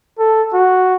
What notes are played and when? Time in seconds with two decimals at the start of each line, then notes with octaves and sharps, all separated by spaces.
0.19 A4
0.53 F#4